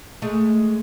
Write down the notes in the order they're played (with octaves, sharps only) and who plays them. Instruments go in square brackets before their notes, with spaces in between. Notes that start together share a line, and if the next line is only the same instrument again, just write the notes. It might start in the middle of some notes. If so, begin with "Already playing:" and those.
[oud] G#3 A3